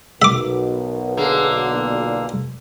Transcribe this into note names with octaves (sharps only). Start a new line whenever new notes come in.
B1 B2 A#4 E5 D6
D3 A#3 G#4
A#2